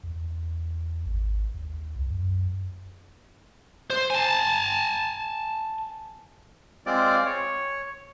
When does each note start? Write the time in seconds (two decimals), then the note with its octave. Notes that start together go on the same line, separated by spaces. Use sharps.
0.03 E2
1.06 G#1
1.54 D#2
1.96 C2
2.10 F#2
3.90 C5
4.10 G#5 A5
6.86 G#3 C4 F4 D5
7.26 C#5